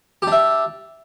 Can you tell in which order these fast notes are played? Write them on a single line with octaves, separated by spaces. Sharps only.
G4 D4 E5